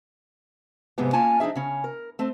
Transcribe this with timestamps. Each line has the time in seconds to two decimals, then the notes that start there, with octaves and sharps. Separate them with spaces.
0.98 F2 G#2 C3 G3 G#3 B3
1.13 A#3 C#4 F4 G#5 A5
1.40 F3 D4 D#4 G#4 E5
1.55 C#3 C#4
1.84 A#4
2.19 A3 C4